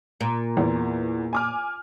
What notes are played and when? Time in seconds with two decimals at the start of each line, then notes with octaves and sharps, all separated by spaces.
0.21 A#2
0.57 E2 E3
1.33 G#5 D6 F6